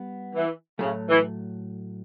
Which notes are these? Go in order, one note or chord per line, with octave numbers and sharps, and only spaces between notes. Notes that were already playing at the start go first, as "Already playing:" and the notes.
Already playing: G3 B3
E3
A2 C#3 F#3 A3
E3